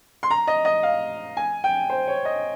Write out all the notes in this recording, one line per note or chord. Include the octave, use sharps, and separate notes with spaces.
C6
A#5
D#5
D#5
F5
G#5
G5
C5
C#5
D#5